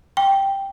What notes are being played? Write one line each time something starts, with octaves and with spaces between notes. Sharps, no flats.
G5